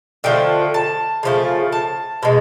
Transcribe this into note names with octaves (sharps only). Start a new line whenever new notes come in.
D3 F3 A3 G5
A5
C#3 F3 A3
A5
B2 G#3